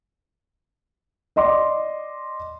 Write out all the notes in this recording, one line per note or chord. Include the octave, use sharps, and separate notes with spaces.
D5 D#5 C6 D6